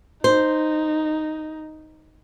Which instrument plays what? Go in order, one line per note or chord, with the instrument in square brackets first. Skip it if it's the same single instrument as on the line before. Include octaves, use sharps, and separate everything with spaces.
[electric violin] D#4 [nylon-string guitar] C5